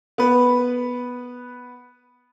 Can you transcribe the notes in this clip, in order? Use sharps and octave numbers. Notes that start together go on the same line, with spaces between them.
B3 B4